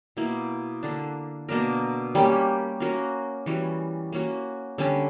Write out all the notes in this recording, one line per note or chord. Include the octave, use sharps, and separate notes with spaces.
B2 A#3 E4
D3 A#3 D4
B2 A#3 D4 A#4
G3 A#3 C#4 G4
A#3 C#4 F#4 A#4
E3 G3 C#4 F#4
A#3 C#4 F#4
D3 G3 C#4